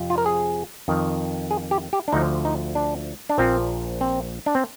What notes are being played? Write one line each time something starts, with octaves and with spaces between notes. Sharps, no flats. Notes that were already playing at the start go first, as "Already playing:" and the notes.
Already playing: F2 C3 F3
F4
A#4
G#4
F2 D#3
G#4
G4
G4
D4
D2 D3 F3 D#4
D#4
D4
D4
A#1 A#2 F3 C4
C4
D4
C4